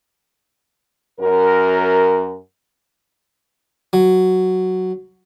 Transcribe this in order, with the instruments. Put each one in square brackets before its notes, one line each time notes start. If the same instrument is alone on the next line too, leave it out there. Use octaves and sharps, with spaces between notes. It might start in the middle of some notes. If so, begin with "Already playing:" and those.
[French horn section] F#2 A#4
[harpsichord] F#3